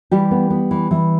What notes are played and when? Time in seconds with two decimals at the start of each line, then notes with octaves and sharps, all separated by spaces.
0.11 E3 G3 G4
0.31 B3
0.50 B3
0.71 E3
0.91 E3